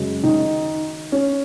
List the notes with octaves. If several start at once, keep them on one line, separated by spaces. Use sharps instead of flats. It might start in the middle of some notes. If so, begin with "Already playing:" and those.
Already playing: F#2 C#3 G#3
D#3 D#4
C#4